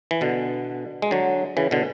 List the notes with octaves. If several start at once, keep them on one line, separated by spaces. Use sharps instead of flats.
E3
B2 D3
G#3
D3 F#3
C#3 E3
B2 D3